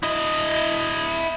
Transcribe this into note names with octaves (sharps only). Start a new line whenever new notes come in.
E4 D#5